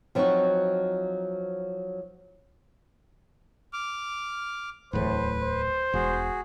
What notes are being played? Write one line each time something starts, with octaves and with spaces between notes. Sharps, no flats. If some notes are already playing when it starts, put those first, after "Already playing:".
F3 F#3 B3 C4 D#4 F#4
D6 F6
D1 E2 A2 B4 C5
C5
E1 F#4 G#4